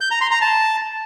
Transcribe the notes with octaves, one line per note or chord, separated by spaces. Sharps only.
G6
A#5
C6
A#5
A5